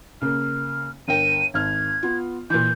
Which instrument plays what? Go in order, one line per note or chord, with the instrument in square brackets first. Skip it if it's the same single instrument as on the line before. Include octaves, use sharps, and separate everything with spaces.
[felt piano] C#3 A#3 [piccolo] F6
[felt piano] G1 A#4 G5 [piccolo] D#7
[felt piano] G#1 F6 [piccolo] G#6
[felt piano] B3 F4
[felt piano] A#2 E3 [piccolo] G6